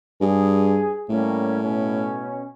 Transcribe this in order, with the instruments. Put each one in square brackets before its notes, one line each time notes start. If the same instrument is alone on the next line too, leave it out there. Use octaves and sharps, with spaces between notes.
[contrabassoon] G2 [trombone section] G#4
[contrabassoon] A2 [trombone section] G3 A#3 C#4
[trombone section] B2 C#4